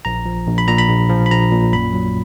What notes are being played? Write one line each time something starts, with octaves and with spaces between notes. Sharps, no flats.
A#1 A#5
F3
A#1
B5
A#2 A#5
B5
A#1
F3
B5
A#1 A#5
A#2
F#2 B5
F#3